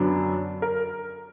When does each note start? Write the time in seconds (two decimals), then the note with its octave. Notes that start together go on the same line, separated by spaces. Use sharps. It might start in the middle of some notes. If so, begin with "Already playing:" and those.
Already playing: F#2 D3 F#3 B3 D4
0.62 A#4